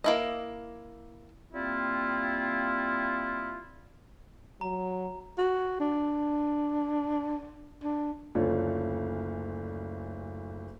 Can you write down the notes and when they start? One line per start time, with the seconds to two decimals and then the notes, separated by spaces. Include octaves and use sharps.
0.04 A#3 E4 D#5
1.53 G3 A#3 C4 E4 F4
4.61 F#3 A#5
5.38 F#4
5.80 D4
7.83 D4
8.35 F#1 D2 A3 F4 C#5 D5